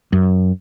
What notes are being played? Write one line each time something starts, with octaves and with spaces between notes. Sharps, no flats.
F#2